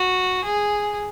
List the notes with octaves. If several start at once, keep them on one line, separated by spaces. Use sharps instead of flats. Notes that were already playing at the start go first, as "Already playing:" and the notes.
Already playing: F#4
G#4